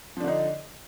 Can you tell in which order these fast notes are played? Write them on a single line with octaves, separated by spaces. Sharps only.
F3 D4 D3 D#4